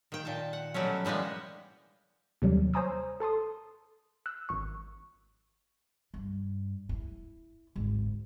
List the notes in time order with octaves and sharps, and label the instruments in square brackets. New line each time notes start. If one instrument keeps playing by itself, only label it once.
[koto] D#3 G5
A#2 A5
F#5
B2 F#3 G3 A3 C#4
E3 G3 G#3 A#3 B3
[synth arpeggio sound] D#2 C3 F#3 G3
C5 C#5 G#5 A#5 D#6 E6
A4 A5 C6 D#6
E6 F#6
G#1 C#6
[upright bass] G2
E4
G#1 D2